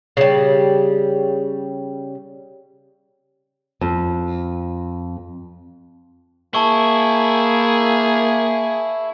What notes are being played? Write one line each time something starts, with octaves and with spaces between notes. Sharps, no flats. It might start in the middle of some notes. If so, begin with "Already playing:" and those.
C#3 G3
F2
A#3 E4 G#4 A5 C#6